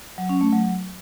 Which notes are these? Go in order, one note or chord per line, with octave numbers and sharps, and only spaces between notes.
F#3
C#4
A3
F#3